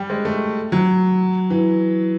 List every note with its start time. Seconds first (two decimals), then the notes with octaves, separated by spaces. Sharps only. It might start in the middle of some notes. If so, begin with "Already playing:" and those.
Already playing: G3
0.10 G#3
0.25 A3
0.72 F#3
1.50 E3